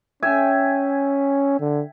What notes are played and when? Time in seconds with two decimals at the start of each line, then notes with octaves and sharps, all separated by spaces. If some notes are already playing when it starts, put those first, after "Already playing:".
0.23 C#4 E5 G5 G#5
1.60 D3